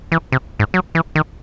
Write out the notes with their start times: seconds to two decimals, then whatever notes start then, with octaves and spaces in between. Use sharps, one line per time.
0.12 E3
0.32 C3
0.59 G#2
0.74 F#3
0.95 E3
1.16 D#3